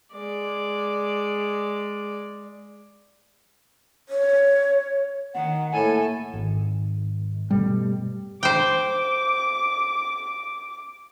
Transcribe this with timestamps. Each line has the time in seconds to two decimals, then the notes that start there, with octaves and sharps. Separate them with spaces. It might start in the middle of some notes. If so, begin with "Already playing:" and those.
0.15 G#3 D5
4.09 C#5
5.34 D#3 F#5
5.73 A2 A#3 A4 G#5
6.34 G#1
7.50 G2 B2 G3 A3
8.43 C5 G5 D6